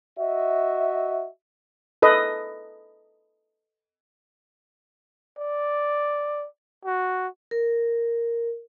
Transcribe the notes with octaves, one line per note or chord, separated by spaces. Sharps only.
F#4 D#5 E5
A4 B4 D#5
D5
F#4
A#4